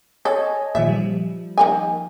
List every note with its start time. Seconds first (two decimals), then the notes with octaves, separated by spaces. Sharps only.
0.25 A4 C#5 D#5 G#5
0.75 A#2 D#3 F3 E5
0.89 F3 G3
1.58 D#3 A#3 G#5